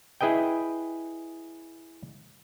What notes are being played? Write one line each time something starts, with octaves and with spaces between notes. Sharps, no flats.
E4 G#4 B4 D#5 G5